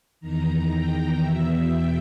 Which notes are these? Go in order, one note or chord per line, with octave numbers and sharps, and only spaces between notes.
E2 D#3 A#5
G5
E2 B2 E5
G5